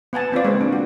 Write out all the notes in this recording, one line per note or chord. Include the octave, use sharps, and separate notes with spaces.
B3 F#5 G#5 A5
B3 C4 F4 D5
G#3 A#3 C4
D4
F#4